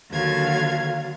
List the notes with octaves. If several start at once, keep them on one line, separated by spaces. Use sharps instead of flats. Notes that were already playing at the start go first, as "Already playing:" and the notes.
D#2 D3 F#3 F5 G#6